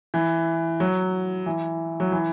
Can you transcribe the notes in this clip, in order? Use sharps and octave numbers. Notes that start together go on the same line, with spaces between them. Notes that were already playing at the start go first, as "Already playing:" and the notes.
E3
F#3
E3
F#3
E3